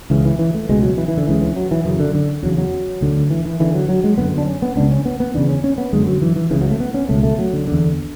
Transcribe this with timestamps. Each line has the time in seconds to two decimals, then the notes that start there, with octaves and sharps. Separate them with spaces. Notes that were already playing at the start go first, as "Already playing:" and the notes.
0.10 C#2 C#3 E3
0.25 E3
0.39 E3
0.54 A3
0.69 C#2 B2 G#3
0.83 F#3
0.98 E3
1.08 E3
1.17 D3
1.27 C#2 C#3 E3
1.42 E3
1.56 F#3
1.71 E3
1.85 F#2 C#3 E3
2.00 D3
2.15 D3
2.43 E2 C#3 F#3
2.58 F#3
3.01 D2 D3
3.30 E3
3.46 E3
3.60 E2 D3 E3
3.74 F#3
3.89 F#3
4.04 G#3
4.17 F#2 D3 B3
4.38 D4
4.47 C#4
4.62 B3
4.76 C#2 C#3 D4
4.91 C#4
5.05 B3
5.20 B3
5.34 E2 C#3 D4
5.49 C#4
5.64 C#4
5.78 B3
5.93 F#2 D3 G#3
6.07 F#3
6.22 E3
6.36 E3
6.51 C#2 C#3 E3
6.61 F#3
6.70 A3
6.80 B3
6.94 C#4
7.09 C#2 B2 A3
7.23 A3
7.39 F#3
7.53 D3
7.68 E2 D3